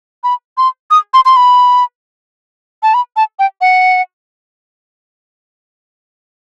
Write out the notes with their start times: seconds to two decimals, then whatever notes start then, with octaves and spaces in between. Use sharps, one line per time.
0.24 B5
0.57 C6
0.91 D#6
1.14 C6
1.25 C6
1.36 B5
2.83 A5
2.94 B5
3.17 A5
3.39 G5
3.61 F#5